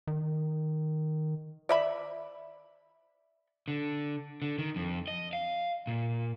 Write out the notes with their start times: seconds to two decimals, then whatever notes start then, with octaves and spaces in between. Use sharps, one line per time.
0.07 D#3
1.69 D5 E5 B5
3.68 D3
4.42 D3
4.59 D#3
4.76 F2
5.08 D#5
5.33 F5
5.87 A#2